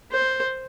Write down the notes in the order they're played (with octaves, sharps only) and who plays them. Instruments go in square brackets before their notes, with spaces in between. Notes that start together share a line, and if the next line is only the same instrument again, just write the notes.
[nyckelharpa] C5